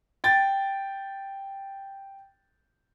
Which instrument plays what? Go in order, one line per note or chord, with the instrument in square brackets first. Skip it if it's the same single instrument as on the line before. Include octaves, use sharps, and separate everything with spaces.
[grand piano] G5 A6